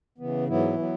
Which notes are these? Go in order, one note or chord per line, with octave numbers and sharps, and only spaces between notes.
C#3 E3 B3
G#2 E3 F#3 B3 E4
F#3 B3